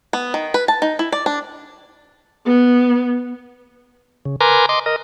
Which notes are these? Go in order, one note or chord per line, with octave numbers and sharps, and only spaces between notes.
B3
D#3
B4
A5
D#4
E4
D5
D4
B3
C#3
A#4 B4 G#5 A#5 C6 D6
D#5 C6 D6
A#4 D#5